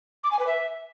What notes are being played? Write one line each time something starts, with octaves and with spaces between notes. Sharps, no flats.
D6
G#5
B4
E5